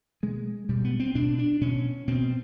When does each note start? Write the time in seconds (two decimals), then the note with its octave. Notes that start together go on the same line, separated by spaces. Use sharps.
0.23 B2 G#3
0.69 B2 G3
0.85 B3
1.00 C4
1.15 B2 D4
1.39 D4
1.61 B2 C#4
2.08 B2 C4